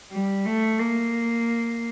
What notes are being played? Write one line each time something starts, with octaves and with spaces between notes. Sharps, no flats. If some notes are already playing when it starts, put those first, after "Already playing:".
G3
A3
A#3